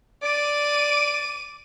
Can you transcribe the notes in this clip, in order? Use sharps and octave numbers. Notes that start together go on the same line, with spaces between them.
D5 D6 D#7